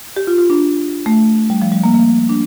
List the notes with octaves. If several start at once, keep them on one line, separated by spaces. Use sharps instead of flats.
G4
F4
F4
D4
A3
G3
F3
G3
A#3
A#3
D4